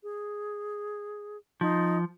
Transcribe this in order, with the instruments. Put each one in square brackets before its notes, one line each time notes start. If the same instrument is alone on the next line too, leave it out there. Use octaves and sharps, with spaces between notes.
[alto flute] G#4
[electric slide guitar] F3 [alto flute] D#4